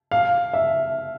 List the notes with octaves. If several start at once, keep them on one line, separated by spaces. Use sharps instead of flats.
F5
E5